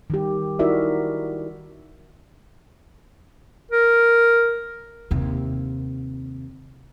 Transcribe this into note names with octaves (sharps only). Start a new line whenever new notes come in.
D#3 G3 G4
D#4 E4 F#4 A#4 D5 E5
A#4
D#2 C3